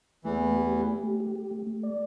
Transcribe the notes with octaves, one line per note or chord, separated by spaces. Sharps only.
E2 E3 A3
A3
G4
A3
G4
A3
G4
G4
A3
A3
D5